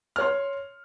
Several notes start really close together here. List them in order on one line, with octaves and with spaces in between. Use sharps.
F6 C#5 C6